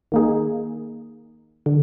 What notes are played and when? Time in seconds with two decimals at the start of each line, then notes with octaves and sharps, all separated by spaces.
0.12 D#3 A#3 D#4 G#4
1.66 D3